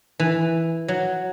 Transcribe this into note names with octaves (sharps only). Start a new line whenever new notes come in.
E3
F#3